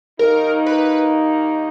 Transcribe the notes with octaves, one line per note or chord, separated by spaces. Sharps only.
D#2 D#3 A#3 D#4 A#4
B4